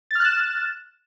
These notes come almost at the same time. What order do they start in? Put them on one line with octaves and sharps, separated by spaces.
A6 F6 F#6 E7